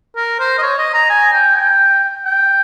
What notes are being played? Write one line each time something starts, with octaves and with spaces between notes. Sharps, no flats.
A#4
C5
D#5
C#5
D#5
A#5
G#5
G5
G5
G5